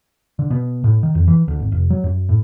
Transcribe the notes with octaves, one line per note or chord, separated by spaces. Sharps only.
D3
B2
A2
D#3
F2
E3
D2
G#1
F1
F#3
F#2
A2